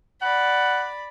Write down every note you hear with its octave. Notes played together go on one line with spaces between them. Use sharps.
D5 F#5 B5